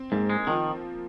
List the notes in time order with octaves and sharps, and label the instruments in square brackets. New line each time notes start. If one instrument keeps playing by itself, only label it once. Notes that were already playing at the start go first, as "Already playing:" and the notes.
Already playing: [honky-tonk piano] C4
[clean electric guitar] G#2 [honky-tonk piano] A#3
[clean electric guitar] G#3
[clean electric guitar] D#3 [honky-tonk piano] F3